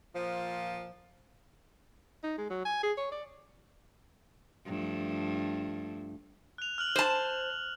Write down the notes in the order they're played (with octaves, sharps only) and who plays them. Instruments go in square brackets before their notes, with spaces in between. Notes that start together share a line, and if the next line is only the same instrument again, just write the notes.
[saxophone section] A#2 F3
[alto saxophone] D#4
G#3
F#3
G#5
G#4
C#5
D5
[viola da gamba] G2 F3 A3
[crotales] F#6 F7
F6 F#6 F#7
[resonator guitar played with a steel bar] C5 A5